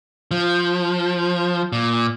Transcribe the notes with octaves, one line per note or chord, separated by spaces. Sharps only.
F3
A#2